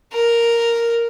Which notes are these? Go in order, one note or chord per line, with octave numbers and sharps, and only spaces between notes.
A#4